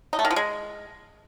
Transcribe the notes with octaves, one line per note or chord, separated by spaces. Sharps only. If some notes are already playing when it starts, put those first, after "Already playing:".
D#4
A3
D#3
F3
G#3